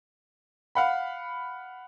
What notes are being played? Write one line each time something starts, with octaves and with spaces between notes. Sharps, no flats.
F5 F#5 B5